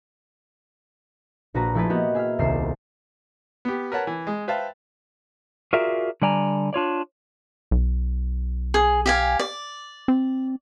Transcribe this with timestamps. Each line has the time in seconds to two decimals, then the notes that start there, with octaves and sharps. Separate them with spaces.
1.54 A#1 F#4 B4 A#5
1.75 F3 A3 E4 G#4 A4 B4
1.89 A#3 B3 F#4 G4 D#5 F#5
2.15 G#4 E5 G#5 F6
2.39 D#1 C2 C3 C7 E7
3.65 B3 G4
3.92 A#4 B4 C#5 F#5 A5
4.07 E3
4.27 G#3
4.48 B4 C5 E5 F5 G5 A5
5.73 F4 F#4 G#4 A#4 D5 E5
6.22 D3 G3 D5 G#5 A#5
6.73 D4 F4 C#5 D5
7.71 B1
8.74 G#4
9.06 G4 F5 G#5
9.39 D5
10.08 C4